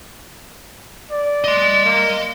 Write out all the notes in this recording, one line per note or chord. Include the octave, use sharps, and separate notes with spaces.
D5
D#5 C6
A#3